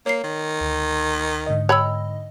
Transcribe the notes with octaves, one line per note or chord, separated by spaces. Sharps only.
A#3 C#5 C7
D#3
D2
G#2 D3 D#5
C#5 G5 B5 E6